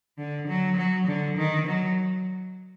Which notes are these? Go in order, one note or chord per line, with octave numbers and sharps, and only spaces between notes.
D3
F#3
F#3
D3
D#3
F#3